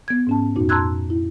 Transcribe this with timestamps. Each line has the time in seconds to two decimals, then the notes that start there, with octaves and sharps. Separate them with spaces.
0.08 B3 G#6
0.27 G#2 C#4 A5
0.56 F2 A#2 D#4 F#4
0.69 A5 A#5 C6 E6 F#6 G#6
1.10 E4